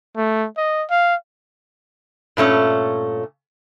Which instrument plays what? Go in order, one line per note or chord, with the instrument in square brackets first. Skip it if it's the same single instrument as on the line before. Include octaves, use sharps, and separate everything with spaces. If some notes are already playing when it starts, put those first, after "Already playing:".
[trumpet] A3
D#5
F5
[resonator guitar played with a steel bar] G2 A#2 A3 C#4